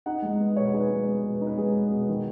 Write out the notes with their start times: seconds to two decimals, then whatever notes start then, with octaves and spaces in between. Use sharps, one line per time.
0.06 D#4 F#5
0.22 G#3
0.40 B3
0.57 B2 C#5
0.65 B4
0.73 D#4 G#4
0.81 B4
0.90 G#3
1.07 B3
1.24 B2
1.41 D#4
1.47 B4
1.57 G#3 G#4
1.75 B3
1.91 B2
2.09 D#3